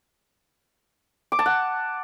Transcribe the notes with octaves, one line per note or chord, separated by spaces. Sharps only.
D6
A5
F#5